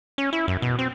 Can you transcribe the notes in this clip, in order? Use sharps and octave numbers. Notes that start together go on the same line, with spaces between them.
C#4
E4
F#2
B2
C4